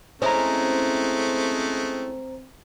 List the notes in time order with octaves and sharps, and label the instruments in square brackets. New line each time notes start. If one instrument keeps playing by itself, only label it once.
[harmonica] G#3 A3 [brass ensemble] C4 [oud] C#4 E4 D#5 [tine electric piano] C5 A#5